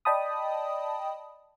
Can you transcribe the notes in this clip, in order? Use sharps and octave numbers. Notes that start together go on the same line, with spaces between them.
D5 D#5 G5 A5 B5 D#6